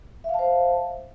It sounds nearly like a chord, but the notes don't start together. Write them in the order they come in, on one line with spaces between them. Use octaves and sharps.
E5 F5 A5 C5